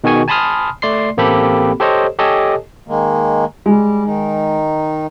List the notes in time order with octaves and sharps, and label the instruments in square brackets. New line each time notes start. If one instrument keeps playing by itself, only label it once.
[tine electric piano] B2 D#3 F#4 G#4 G#5 C#6
G#5 A5 B5 C6 D#6 F6
A3 D5 C6 C7
A1 A#3 C4 G4 A4 B5
G4 A4 C5 C#5 D#5
G4 A4 C#5 D#5 G#5 A5
[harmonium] D#3 G#3 A#3
[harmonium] G3 [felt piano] G#3
[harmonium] D#3 D#4